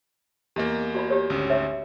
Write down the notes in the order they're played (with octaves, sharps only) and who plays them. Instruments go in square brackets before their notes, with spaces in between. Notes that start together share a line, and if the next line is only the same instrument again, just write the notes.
[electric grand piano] E2 A#3 [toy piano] G4 D#5
[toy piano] F#4 D5 B5
G4 C#5 D5
[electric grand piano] G#1 D2 C#4
[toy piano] C#5 E5